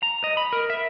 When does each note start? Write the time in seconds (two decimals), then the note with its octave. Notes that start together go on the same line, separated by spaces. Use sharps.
0.03 A#5
0.24 D#5
0.37 B5
0.53 A#4
0.70 E5